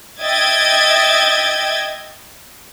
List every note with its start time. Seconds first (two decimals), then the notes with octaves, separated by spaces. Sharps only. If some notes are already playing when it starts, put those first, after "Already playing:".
0.20 D#5 E5 G5 G#6 A6